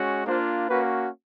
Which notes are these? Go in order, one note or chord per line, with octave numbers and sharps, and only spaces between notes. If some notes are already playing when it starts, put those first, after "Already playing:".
Already playing: G#3 C#4 F#4
A#3 D4 F4 C5
A#3 C#4 F#4 B4